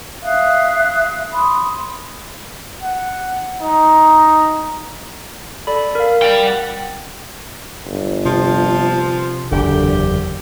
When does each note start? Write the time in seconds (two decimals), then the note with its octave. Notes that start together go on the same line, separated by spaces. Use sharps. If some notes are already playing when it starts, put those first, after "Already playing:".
0.23 E5 F5 D#6 F#6
1.31 B5 C6 D#6
2.82 F#5
3.61 D#4
5.67 A4 D5 B5
5.95 A#4 F5
6.22 G3 G5
6.46 F#5
7.86 G1
8.25 C3 F3
9.51 F#1 E2 D3 G4